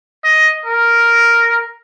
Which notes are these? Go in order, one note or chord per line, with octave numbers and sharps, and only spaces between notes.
D#5
A#4